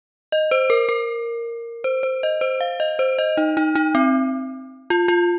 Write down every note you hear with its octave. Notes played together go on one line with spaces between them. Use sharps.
D#5
C5
A#4
A#4
C5
C5
D#5
C5
F5
D#5
C5
D#5
D#4
D#4
D#4
C4
F4
F4